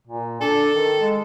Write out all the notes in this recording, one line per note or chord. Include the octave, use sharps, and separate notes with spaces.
A#2
D4 A4
D#3
G#3